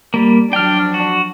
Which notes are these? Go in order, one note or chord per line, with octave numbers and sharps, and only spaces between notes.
G3 A#3
F3 F#3 D4 G5 F6
F#4